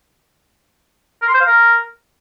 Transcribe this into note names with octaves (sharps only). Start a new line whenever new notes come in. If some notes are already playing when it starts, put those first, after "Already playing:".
A#4
C6
C5
F5
A#4